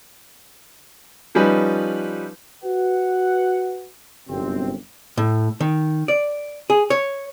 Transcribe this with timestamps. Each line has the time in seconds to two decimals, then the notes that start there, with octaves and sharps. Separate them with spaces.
1.35 F3 G3 C#4 D#4 B4
2.64 F#4 B4 F#5
4.28 G1 F#2 C3 C4
5.17 A2
5.60 D#3
6.08 D5
6.70 G#4
6.90 C#5